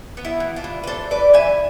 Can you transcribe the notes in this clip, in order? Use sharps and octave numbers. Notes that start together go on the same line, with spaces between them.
B3
E4
E3
D4 F4
E3
B4
D4 A4 C5
E3 B4 D5
E3 E5 G#5